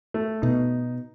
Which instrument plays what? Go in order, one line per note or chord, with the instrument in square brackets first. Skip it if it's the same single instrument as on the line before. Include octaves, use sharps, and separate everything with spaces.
[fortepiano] A3
[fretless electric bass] B2 [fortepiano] D#4